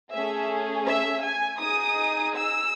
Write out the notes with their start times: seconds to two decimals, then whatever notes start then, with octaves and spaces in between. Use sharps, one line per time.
0.11 A3 C#4 G#4 E5
0.86 E5
1.23 G#5
1.60 D#4 G#4 D#6
2.35 E6